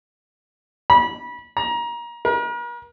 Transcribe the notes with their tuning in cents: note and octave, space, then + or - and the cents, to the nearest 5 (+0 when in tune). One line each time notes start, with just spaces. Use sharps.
B5 -25
A#5 +25
A#4 +45